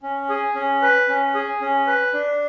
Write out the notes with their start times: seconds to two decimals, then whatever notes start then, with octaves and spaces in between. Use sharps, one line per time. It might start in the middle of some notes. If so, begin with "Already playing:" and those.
0.03 C#4
0.29 G#4
0.55 C#4
0.82 B4
1.09 C#4
1.34 G#4
1.61 C#4
1.87 B4
2.13 D4